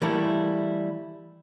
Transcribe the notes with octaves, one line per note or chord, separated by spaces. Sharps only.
E3 G3 A3 A#3 E4